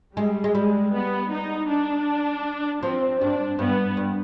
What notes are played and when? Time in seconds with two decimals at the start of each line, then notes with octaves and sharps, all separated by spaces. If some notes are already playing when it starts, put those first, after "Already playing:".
0.17 G3 G#3
0.44 G#3
0.55 G3 G#3
0.93 B3
1.31 D#4
1.69 D4
2.83 F3 C4
3.21 G2 D4
3.59 G2 B3
3.97 G2